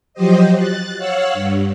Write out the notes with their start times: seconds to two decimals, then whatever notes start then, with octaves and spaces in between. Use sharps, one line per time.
0.14 F3 F#3 G4 C5 D#5
0.53 F#6 A6
0.97 C#5 F5 F#5 E6 F#6
1.33 G2